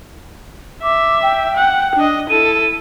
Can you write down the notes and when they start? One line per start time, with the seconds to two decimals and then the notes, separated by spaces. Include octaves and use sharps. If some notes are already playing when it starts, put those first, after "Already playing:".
0.83 E5 D6
1.22 G5
1.57 F#5
1.96 D4 D#5
2.30 E4 A4 D#7